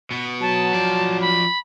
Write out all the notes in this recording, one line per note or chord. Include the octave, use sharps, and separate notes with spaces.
B2 B3
F#3 A5
F3 D5
B5